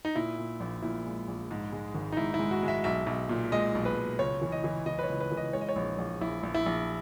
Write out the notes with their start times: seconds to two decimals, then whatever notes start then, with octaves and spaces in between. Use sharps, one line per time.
0.05 D#4
0.15 A#2 E4
0.38 A#2
0.60 A#1
0.82 A#2 E4
1.05 G#3
1.28 A#1
1.51 G#2
1.72 G#3
1.95 G#1
2.12 D#4
2.17 G#2 E4
2.34 E4
2.39 G#3
2.51 F#4
2.63 G#3
2.68 E5
2.84 B1 E5
3.06 B1
3.29 A#2
3.52 G#3 D#5
3.75 B1
3.85 B4
3.97 B1
4.19 C#2 C#5
4.42 E3
4.52 D#5
4.64 E3
4.86 E3 D#5
4.99 B4
5.03 C#5
5.09 C#2
5.20 B4
5.31 E3
5.37 D#5
5.53 G#3 C#5
5.61 D#5
5.68 C#5
5.76 A#1
5.98 A#1
6.21 A#1 E4
6.43 A#1
6.54 E4
6.66 A#1